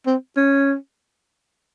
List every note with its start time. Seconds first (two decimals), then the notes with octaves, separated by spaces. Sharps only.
0.07 C4
0.37 C#4